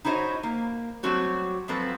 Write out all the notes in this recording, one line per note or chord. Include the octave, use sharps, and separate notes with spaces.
D#4 E4 F#4 C5 C#5 D#5
A#3
F#3 G3 A3 C4 F#4 C#5
F3 F#3 G#3 C4 A4 B4